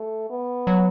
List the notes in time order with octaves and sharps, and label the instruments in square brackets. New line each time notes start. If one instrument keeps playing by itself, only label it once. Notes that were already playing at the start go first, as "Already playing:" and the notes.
Already playing: [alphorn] A3
B3
[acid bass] F#3